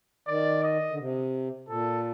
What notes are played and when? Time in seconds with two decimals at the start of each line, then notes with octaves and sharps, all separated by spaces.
0.27 D#3 D5
0.63 D#5
0.91 D3
0.99 C3
1.69 A#2 A4